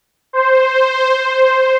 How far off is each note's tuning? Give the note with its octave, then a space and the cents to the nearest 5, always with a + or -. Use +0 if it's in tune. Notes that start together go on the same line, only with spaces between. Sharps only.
C5 +0